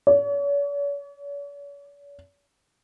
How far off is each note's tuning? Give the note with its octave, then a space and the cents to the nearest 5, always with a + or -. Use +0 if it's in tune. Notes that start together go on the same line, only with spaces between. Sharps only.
C#5 +45